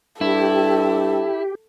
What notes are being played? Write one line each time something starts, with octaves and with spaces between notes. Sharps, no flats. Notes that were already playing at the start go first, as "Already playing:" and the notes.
G2 E4 G4 A4